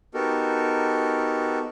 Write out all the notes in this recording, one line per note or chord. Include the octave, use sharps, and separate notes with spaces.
B3 D#4 F#4 G4 A4 A#4